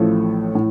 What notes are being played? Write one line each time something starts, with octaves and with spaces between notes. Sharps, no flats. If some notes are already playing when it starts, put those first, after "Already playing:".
Already playing: A1 A2 F3 A3
A2